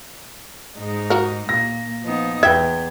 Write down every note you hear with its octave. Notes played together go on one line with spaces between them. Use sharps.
G#2 G#3 D#4
F#4 A#4
A#2 A#3 A#6
F3 B3 D#4
E2 B4 E5 G5 G#6